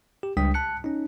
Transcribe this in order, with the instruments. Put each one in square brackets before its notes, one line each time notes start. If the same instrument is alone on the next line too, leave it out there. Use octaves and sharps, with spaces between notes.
[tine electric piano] G4
C#2 G3 D4 G5 D#6 B6
A5 F#6 C#7
C#4 D#4